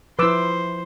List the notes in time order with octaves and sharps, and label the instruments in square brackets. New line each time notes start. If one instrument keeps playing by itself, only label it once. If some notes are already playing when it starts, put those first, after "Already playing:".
[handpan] F3 E4 [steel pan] B4 D6 E6 [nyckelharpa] C5